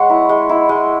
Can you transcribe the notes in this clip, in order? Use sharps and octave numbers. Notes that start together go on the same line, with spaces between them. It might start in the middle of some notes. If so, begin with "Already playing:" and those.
Already playing: G#3 C#5 F#5 B5
E4
G#3
E4
G#3